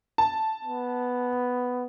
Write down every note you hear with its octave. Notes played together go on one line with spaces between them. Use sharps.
A5
B3